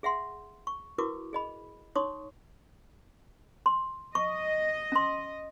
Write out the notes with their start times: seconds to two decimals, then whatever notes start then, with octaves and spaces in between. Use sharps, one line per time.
0.03 G#4 E5 F#5 C6
0.67 C#6
0.98 E4 F#4 A#4 B4 C#6 D6
1.33 G#4 D#5 B5
1.95 D#4 C#5 C6 C#6 D#6
3.66 C6
4.15 D#5 C#6
4.92 C#4 C6